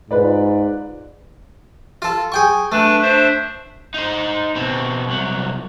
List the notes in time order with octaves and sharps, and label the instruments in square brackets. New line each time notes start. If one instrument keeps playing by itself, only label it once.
[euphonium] G#2 [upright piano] F4 B4 D5
[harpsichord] F4 A4
G#4 G5 C#6
[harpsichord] A3 [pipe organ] D4 B4
[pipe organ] D4 C5 E5
[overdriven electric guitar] D#4 C5
B2 C4
C2 F#3